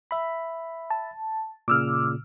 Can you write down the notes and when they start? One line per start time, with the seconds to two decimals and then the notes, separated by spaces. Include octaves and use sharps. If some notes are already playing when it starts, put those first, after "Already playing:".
0.11 E5 B5
0.90 A5
1.68 A#2 C#3 D6 E6 F6